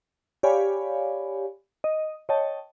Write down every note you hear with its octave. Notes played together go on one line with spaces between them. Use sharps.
G4 C#5 D5 F5 G#5 B5
D#5
C#5 D#5 G5 A5